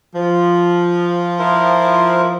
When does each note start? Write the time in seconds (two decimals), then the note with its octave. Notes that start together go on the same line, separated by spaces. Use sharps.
0.14 F3
1.39 E4 A#4 C5